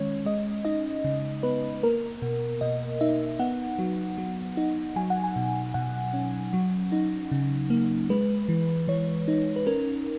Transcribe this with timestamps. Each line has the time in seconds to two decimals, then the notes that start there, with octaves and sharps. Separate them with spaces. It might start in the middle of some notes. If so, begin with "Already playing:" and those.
Already playing: D#3 G#3 C#4 C#5
0.26 G#3 D#5
0.64 D#4 D#5
1.04 C#3
1.43 B3 B4
1.83 A#3 A#4
2.22 B2
2.61 B2 D#5
3.01 D#4 E5
3.39 B3 F#5
3.79 F#3
4.18 F#3
4.57 D#4
4.96 F#3 G#5
5.10 F#5
5.24 G#5
5.36 B2
5.74 B2 F#5
6.13 C#4
6.53 F#3
6.92 D#4
7.32 C#3
7.70 A#3
8.09 G#3 B4
8.49 E3
8.88 E3 C#5
9.28 D#4
9.56 B4
9.67 C#4 A#4